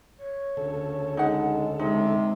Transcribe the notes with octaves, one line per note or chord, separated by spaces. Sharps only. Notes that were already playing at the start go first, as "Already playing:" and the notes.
C#5
D2 C#3 A4
G#3 D#4 F#5
C3 G#3 D#4